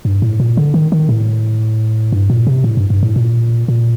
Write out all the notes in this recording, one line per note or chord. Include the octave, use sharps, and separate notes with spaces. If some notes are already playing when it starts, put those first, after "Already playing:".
G2
A2
A#2
D3
D#3
D#3
A2
G2
A#2
C3
A2
G2
G2
A2
A#2
A#2